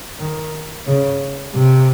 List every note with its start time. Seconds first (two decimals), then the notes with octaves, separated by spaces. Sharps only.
0.19 D#3
0.87 C#3
1.54 C3